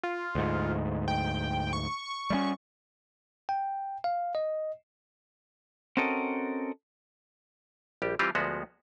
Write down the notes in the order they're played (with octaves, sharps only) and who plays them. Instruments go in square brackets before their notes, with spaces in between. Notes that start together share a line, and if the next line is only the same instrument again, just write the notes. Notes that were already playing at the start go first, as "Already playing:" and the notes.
[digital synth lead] F4
[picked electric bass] D2 G#2
[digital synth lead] G5
C#6
[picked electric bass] G3 G#3 C#4
[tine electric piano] G5
F5
D#5
[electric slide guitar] C4 C#4 F#4 A4 A#4 D#5
[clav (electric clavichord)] A#1 G3 G4
E3 G3 C4 F4 G4
D2 F3 G#3 B3 F#4